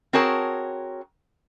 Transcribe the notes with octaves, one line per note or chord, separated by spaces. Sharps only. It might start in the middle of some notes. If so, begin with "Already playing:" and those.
C4 F#4 G#4 A#4 C#5 A5